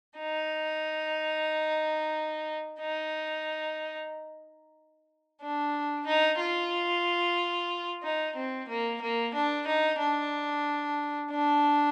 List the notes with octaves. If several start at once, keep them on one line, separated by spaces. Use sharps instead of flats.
D#4
D#4
D4
D#4
F4
D#4
C4
A#3
A#3
D4
D#4
D4
D4